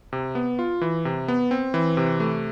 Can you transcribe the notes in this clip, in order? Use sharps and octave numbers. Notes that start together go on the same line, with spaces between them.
C3
B3
F4
E3
C3
B3
C4
E3
C3
A3